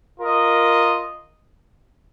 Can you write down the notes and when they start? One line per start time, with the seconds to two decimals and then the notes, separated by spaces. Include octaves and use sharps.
0.20 F4 A#4 D#5